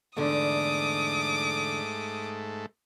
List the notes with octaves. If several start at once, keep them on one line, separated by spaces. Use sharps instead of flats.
E2 G#2 D3 A3 D6 D#6